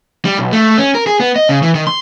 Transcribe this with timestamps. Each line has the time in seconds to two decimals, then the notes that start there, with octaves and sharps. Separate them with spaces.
0.25 G3
0.38 B1
0.52 A3
0.78 C#4
0.95 A#4
1.07 G#4
1.20 B3
1.36 D#5
1.49 C#3
1.63 E3
1.75 D#3
1.87 C6